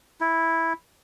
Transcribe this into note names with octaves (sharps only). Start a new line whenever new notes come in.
E4